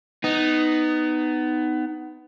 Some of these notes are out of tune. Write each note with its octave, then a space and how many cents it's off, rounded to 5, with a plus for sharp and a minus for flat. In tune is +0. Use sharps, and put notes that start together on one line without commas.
B3 +20 D#4 -5